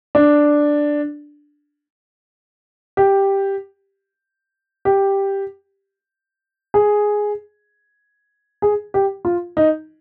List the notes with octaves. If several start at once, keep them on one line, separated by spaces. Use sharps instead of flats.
D4
G4
G4
G#4
G#4
G4
F4
D#4